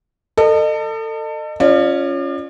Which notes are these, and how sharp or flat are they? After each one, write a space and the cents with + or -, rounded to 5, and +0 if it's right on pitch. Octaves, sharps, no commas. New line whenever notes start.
A4 +30 D#5 -30
C#4 +0 F4 +0 D5 +40